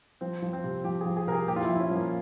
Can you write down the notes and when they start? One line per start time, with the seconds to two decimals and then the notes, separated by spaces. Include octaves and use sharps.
0.21 F3 C4
0.42 F3
0.53 C4
0.64 C3
0.84 F3 G4
1.01 G#4
1.05 F3
1.17 G#4
1.27 C3 A#4
1.32 G#4
1.48 A#2 G4
1.56 F4
1.64 E4
1.69 F3
1.75 E4
1.80 C#4
1.91 F3 A#3